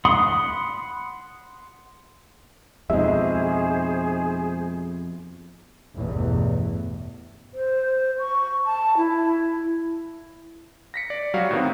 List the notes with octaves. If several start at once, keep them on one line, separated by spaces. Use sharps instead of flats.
F#5 B5 C6 D#6
F2 B2 G#3 D#4 G#4 C5 E5
A1 E2 G2 B2
C5
C#6
A5
E4
A#6 B6 C#7
D5
F#3 G3 F#4 F5
A2 D#3 B3 C4